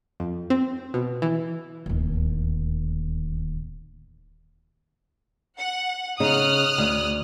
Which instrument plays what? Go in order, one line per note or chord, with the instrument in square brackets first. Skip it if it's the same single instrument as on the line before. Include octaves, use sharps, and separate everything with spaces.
[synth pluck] F2
C4
B2
E3
[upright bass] D1 D#2
[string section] F#5
[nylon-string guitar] C#3 D#4 [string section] D#6 F6 F#6
[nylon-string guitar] D2